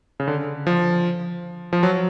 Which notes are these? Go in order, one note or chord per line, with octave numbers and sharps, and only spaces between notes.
C#3
D3
F3
F3
F#3